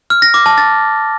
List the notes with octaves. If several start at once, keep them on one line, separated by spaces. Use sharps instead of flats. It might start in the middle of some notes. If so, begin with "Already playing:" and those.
F6
A#6
D6
A5
A6